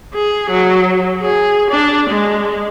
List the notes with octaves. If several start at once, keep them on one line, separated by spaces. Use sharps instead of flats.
G#4
F#3
G#4
D4
G#3